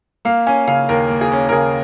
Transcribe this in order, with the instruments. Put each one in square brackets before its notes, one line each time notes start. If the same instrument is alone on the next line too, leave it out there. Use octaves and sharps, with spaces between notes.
[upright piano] A#3 F5
C#4 G#5
C#3 F5
D#2 A#4
A#3
G#4
C#4
A#4
C#3 G#4